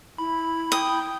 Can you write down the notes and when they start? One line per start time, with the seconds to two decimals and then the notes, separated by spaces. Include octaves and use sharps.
0.18 E4 B5
0.72 G5 D#6